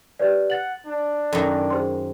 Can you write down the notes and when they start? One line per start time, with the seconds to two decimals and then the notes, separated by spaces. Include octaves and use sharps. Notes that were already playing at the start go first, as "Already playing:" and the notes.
0.19 G4 B4 D5
0.50 F#5 A6 F#7
0.87 D4
1.33 F#2 D#3 A4
1.70 G#4 C5 C6